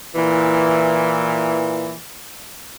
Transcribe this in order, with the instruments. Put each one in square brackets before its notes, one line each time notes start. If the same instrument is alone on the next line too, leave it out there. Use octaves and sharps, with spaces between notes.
[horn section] A#2 E3